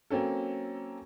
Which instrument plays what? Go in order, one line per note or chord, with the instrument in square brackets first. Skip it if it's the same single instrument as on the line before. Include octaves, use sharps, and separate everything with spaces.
[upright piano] F#3 A#3 C4 C#4 A4